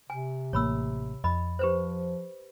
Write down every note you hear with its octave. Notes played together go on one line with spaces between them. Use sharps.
C3 G#5
A1 A#3 C#5 B5 E6
F2 D#5 B5
F3 G4 B4 C5